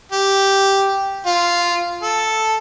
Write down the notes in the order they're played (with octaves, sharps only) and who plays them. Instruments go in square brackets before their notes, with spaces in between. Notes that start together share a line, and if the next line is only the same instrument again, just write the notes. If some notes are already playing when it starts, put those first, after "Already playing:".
[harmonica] G4
F4
A4